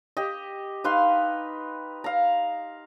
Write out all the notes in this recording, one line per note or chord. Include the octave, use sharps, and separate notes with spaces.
G4 D#5
D#4 B4 F5 C6
F5 A#5